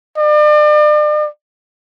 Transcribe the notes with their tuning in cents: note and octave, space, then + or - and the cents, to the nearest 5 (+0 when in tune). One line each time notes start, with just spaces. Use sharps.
D5 +40